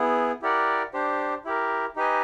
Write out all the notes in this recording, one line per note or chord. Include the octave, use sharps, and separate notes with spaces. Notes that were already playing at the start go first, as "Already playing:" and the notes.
Already playing: B3 E4 G#4
E4 G4 A#4 D5 F#5
D4 G4 C5
E4 G4 A#4
D#4 G4 B4 D#5 G#5